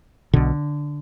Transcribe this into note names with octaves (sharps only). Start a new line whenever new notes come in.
B1 B2 D3